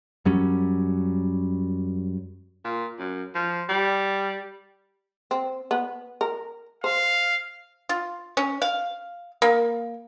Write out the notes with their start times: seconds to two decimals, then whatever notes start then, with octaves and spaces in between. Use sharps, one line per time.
0.25 F#2 F#3 G3 C#4
2.64 A#2
2.99 F#2
3.35 F3
3.69 G3
5.31 C4
5.71 B3
6.21 A#4
6.84 C5 F5
7.89 F4
8.37 C#4
8.62 F5
9.42 A#3